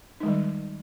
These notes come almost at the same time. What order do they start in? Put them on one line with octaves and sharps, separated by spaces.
D#4 G#3 D#3 G3